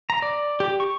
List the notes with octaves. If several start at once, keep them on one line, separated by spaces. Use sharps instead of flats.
A#5
D5
G4
C#6